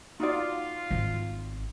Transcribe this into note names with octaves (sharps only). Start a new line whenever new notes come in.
D#4 F4 F#4 D5
G#1